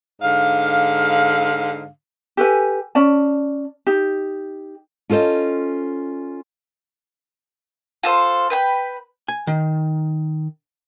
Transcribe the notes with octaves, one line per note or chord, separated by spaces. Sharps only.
G#2 D3 F5
G4 A4 B4 G#5
C#4 D5 A5
D#4 G4
C#4 F4 A4 C5 D#5
F4 A4 C5
B4 G5 B5
G#5
D#3